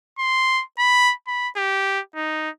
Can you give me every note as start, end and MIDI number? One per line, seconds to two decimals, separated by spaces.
0.19 0.63 84
0.79 1.13 83
1.27 1.48 83
1.56 2.00 67
2.16 2.50 63